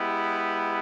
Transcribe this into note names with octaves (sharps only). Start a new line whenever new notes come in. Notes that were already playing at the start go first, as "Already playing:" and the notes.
Already playing: G#3 B3 E4 G4